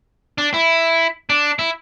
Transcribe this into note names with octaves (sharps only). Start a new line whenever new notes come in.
D4
E4
D4
E4